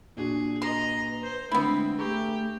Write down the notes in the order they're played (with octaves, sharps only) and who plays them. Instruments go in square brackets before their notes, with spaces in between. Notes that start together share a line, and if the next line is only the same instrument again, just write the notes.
[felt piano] A#2 D4 F#4 [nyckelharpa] G#4
[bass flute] B4 [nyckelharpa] D#5 A#5 [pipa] C6
[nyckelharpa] C5
[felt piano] D3 A3 [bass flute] G#3 [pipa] B3 E4 [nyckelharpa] C4
[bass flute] A3 [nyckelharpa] G4 [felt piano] G#4 A#5 C#6